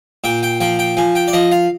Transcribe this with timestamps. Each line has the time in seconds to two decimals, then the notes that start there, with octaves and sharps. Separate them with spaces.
0.24 A#2 G5
0.43 G5
0.60 F3 G5
0.79 G5
0.97 F3 G#5
1.15 G5
1.28 D5
1.33 F3 D#5
1.52 F5